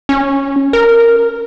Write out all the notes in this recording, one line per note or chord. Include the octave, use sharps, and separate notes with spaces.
C#4
A#4